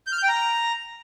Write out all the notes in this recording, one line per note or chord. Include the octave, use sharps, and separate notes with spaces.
G6
F6
G6
G5
A#5